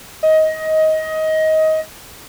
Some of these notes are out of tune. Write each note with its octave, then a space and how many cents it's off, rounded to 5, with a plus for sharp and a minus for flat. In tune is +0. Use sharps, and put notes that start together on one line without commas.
D#5 +20